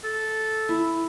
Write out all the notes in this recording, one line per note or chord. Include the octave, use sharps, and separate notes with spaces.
A4
E4